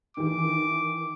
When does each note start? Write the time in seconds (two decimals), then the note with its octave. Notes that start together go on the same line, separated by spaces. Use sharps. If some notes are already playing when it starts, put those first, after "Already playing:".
0.17 D#3 E3 D6